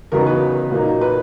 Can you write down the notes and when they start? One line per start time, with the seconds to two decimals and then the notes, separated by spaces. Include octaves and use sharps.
0.12 E2 C#3 F#3 B3 D#4 A#4
0.27 B4
0.71 A#2 F#3 A#3 D#4
1.01 B4